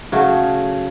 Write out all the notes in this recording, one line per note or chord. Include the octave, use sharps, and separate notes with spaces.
C#3 F#3 A3